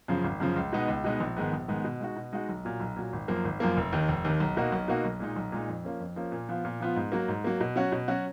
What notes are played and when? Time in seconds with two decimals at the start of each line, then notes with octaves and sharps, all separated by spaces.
0.08 F#2 C#3 F3
0.24 G#1
0.40 F#2 C#3 F3
0.56 C#2
0.73 B2 G#3 B3 D#4
0.88 C#2
1.04 B2 G#3 B3 D#4
1.20 A#1
1.37 G#2 D#3 G#3 B3
1.53 A#1
1.68 G#2 D#3 G#3 B3
1.85 B2
2.00 G#3 D#4 F#4
2.16 B2
2.32 G#3 D#4 F#4
2.49 B1
2.65 A#2 F#3
2.80 B1
2.96 A#2 F#3
3.13 G#1
3.28 F#2 F3 A#3
3.45 G#1
3.60 F#2 F3 A#3
3.77 F1
3.93 D#2 D#3
4.08 F1
4.25 D#2 D#3
4.40 B1
4.57 B2 A#3 D#4 F#4
4.72 B1
4.88 B2 A#3 D#4 F#4
5.05 B1
5.20 A#2 G#3 D#4
5.36 B1
5.52 A#2 G#3 D#4
5.68 F2
5.84 F3 A#3 C#4
6.00 F2
6.16 F3 A#3 C#4
6.32 A#2
6.49 F3 B3 F4
6.65 A#2
6.80 F3 B3 F4
6.96 G#2
7.12 F#3 A#3
7.28 G#2
7.44 F#3 A#3
7.61 B2
7.76 F#3 C#4 F#4
7.92 B2
8.08 F#3 C#4 F#4